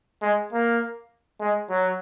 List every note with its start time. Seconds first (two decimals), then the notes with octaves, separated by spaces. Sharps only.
0.22 G#3
0.52 A#3
1.40 G#3
1.70 F#3